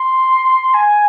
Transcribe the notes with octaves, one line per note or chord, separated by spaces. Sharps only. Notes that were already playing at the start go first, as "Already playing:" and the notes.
Already playing: C6
G#5